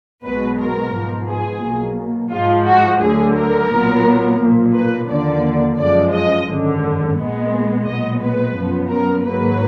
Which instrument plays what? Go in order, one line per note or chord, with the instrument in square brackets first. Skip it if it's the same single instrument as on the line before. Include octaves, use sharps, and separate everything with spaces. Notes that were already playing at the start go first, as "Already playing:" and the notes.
[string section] B1 B2 G#3 B3 B4
A#4
G#2 F3 B3
G#4
B1 B2 A#3
G#2 F3 G#3 F4
F#4
D2 D3 F#3 G#4
A#4
B1 A#2 F#3 B3
B1 A#2 F3 A#3
B4
D#2 D3 F3 A#3 D5
F#2 F3 G#3 D5
D#5
G#1 F#2 D3
A#1 A#2 G#3 B3
B1 A#2 G#3 B3 D#5
B4
F#2 F3 B3
A#4
G#1 G#2 F#3 A#3 B4